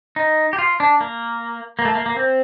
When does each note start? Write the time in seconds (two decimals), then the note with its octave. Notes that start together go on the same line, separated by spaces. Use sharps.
0.16 D#4
0.53 G4
0.58 F4
0.80 D4
1.01 A#3
1.79 A#3
1.85 A3
1.95 A#3
2.06 A#3
2.16 C4